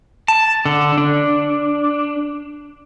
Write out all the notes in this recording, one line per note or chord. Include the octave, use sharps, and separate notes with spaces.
A5
D3
D4